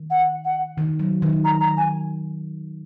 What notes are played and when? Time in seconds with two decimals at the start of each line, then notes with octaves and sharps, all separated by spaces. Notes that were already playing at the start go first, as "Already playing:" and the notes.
Already playing: D#3
0.10 F#5
0.45 F#5
0.78 D#3
1.00 F#3
1.22 D#3
1.44 A#5
1.60 A#5
1.77 G#5